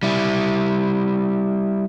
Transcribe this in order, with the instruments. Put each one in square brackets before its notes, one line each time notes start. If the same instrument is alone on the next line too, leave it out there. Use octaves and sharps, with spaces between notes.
[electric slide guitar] G3 E4